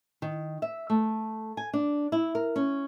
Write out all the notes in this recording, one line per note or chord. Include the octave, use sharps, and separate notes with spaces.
D#3
E5
A3
G#5
D4
E4
A#4
C#4